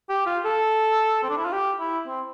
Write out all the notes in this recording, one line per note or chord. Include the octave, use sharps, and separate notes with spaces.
G4
F4
A4
C4
D4
E4
F4
G4
E4
C4